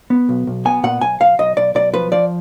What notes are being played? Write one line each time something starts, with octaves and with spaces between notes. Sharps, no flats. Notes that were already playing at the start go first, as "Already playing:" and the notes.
B3
B1
B1
B3 G#5
A#2 F#5
B1 G#5
B1 F5
B1 D#5
B1 D5
B1 D5
F3 B4
F3 D5